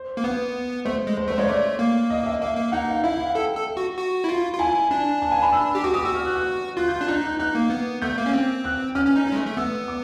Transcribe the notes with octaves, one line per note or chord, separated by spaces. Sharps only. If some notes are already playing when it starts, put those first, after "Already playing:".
Already playing: C5
A#3
B3 B4
A3 C5
G#3
C5
A3 C5
G#3 C#5
A3 D5
A#3
D#5
E5
A#3 E5
A#3
D#4 F#5
F5
E4 E5
F5
F#5
A4 G5
A4
F#4
F#4
E4
F4
F4
E4 G#5
D4
A5
G#5
B5
E6
G4
F#4 D6
G4 D#6
F#4 E6
F6
F#6
F#6
F4 F#6
G6
F#6
D4
D#4 F#6
F#6
D#4 F#6
A#3
B3
A3 G6
A#3
C#4
C4
F#6
C#4 F6
C#4
D#4
C#4
G#3
A3
A3
B3 E6
D6